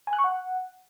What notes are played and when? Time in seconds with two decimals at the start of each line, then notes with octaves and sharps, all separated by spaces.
0.07 G#5
0.13 F#6
0.19 C#6
0.24 F#5